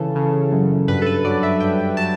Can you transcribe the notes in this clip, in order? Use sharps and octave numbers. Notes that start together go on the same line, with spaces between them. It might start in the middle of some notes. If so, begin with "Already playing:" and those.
Already playing: C#3 E3 A4
C#3
F#2
G2 B4
A4
B4
F#3 D5
E5
G2 G5
F#3 A5